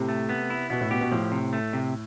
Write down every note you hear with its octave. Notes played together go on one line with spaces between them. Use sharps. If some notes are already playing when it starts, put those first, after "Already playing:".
Already playing: A2 C3
A3
B3
E4
B2 B3
A2
B2 G4
B2
A2 F3
C3
A3
C3